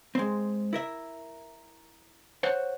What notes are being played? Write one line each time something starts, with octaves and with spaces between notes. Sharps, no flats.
G#3 C4
E4 A#4 E5
C5 C#5 F#5